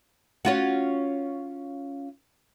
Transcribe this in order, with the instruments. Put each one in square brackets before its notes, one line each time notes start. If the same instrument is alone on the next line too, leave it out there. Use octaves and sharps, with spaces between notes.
[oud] C#4 F4 F#4